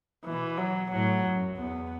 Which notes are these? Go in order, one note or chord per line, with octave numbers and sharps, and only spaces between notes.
B2 E3
F#3
A2 F#3
F#2
E2 B3